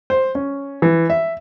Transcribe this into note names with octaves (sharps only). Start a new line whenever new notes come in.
C5
C#4
E3
E5